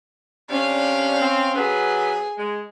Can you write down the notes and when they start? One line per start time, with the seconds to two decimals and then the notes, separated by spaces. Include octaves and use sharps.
0.50 C3 G3 C#4 D4 F5
1.21 C4
1.56 F#3 B3 G#4 B4
2.38 G#3